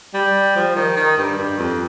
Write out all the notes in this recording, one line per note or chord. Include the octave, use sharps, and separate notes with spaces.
G3
F3
D#3
D#3
G2
G2
F2